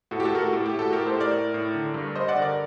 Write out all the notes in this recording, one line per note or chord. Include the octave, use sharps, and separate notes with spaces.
A2 F#4 A4
G4
F#4 A4
A2 A#4
F#4 A4
A2 G4
G4
A2
F#4 A4
A2 G4 A#4
A4 C5
A2
A#4 D5
A2
A2
D3
G2
G2 C5 D#5
D5 F#5
D3
A#4 D5